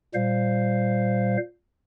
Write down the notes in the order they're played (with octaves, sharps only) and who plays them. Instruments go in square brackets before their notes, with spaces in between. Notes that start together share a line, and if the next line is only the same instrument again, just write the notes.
[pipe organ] A#2 G3 C5 F5